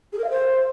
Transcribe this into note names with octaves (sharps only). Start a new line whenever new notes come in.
G#4
A#4
F5
C5